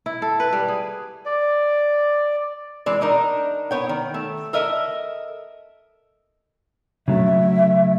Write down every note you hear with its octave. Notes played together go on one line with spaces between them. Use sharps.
E4
A4
B4
G3
G#4
D5
E3 G#3 D5
D4 D#4 A#4
B3 C#5 G5
D#3
A3
A4 A#4 D#5 E5
C#3 F#3 A3 E5